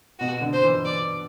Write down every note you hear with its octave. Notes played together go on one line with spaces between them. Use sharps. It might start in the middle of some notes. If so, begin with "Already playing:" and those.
B2 F#4
D3
C5
E3
D5